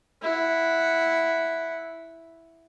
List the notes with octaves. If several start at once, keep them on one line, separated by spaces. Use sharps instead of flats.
E4 F#5